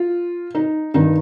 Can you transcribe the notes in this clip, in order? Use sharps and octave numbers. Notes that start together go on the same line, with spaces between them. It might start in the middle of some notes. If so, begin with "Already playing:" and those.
Already playing: F4
D#4
G2 D#3 D#4